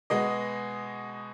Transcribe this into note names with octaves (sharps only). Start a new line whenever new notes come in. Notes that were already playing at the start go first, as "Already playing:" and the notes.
B2 G#3 B3 D#5